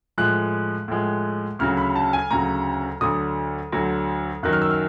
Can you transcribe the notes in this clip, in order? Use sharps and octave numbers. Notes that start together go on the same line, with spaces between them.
A2 F3 G#3 F#6
A2 F3 G#3
D2 C#3 F#3 F6
B5
A5
G#5
D2 C#3 F#3 A#5
D2 D3 F#3 D#6
D2 D3 F#3
F#2 D#3 F#3 F#6
F6
E6
F6